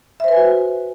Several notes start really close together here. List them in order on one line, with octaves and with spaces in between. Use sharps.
E5 C5 B4 G#5 F#4